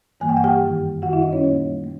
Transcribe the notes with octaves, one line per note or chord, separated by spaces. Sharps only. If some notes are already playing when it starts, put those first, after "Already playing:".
G2 E3 G3 A#3 G#5
G5
F#5
G4 G5
F#2 D#3 G3
F#2 D#3 G3 F#4 F#5
E4 E5
D#4 D#5
C#4 C#5
A#2 G3 A#3
A3